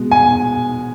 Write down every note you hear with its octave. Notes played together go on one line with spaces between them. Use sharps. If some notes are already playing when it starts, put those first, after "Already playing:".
Already playing: B2 G#3
G#5